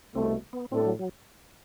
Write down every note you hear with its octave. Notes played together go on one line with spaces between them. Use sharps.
C2 B2 A3 C4
B3
A2 G3 C4 D4 A4
F#3
F#3